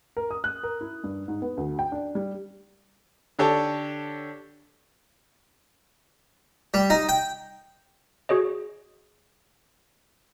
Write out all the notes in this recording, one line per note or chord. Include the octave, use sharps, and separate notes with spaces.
A#4
D#6
F#6
A#4
E4
G2
G#2
B3
D2
G5
D4
G3
D3 D4 G4 A4 C#5 A5
G3
D#4
G5
F#4 G#4 C#5 D#5